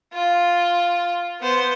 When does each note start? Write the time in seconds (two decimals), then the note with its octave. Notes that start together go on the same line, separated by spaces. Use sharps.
0.13 F4
1.40 B3 C5